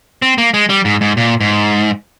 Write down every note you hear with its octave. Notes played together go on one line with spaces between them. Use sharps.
C4
A#3
G#3
G3
G#2
G#2
A#2
G#2